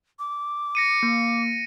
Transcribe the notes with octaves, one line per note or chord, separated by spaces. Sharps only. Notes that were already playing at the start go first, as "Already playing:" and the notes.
D6
A#6 C#7 D#7
A#3